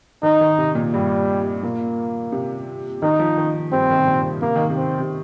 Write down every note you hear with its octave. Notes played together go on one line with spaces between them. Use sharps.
D#3 D#4
D#3
C3
A#2
G2 G3
A#2 A#3
C3
D#3 D#4
F3
D#3
G2 C4
D#3
C3
A#2
C3 A#3
D#3
C3
C4
C3